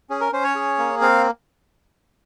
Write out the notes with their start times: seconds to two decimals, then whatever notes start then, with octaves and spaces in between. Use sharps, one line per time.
0.10 C#4 G#4
0.21 A#4
0.32 C#4 C5
0.44 C#5
0.55 G#4
0.79 A#3
1.01 C4 F5